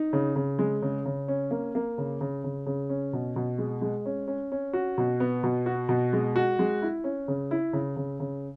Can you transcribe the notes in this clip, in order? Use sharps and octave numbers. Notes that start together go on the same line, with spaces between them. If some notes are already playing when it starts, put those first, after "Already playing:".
Already playing: D#4
C#3
C#3
G#3
C#3
C#3
C#4
A#3
A#3
C#3
C#3
C#3
C#3
C#4
B2
B2
G#3
G#3
C#4
C#4
C#4
F#4
B2
B3
B2
F#4
B2
G#3
F#4
G#3
E4
C#4
C#3
E4
C#3
C#3
C#3